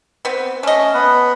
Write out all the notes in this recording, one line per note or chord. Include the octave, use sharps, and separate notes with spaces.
B3 C4
A3 C#4 D#5
B3 B4